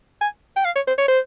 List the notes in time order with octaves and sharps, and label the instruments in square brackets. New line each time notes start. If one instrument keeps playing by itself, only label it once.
[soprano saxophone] G#5
G5
F5
C#5
C5
C#5
C5